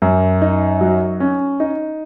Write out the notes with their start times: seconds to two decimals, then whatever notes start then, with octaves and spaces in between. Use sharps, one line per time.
0.02 F#2
0.42 D#4
0.81 F#3
1.20 C#4
1.60 D#4